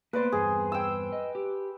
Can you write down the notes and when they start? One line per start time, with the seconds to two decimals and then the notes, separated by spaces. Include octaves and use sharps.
0.13 A#3 B3 B4 C5 D5
0.32 E2 G2 C4 G#4
0.72 G5 E6
1.13 D#5
1.35 G4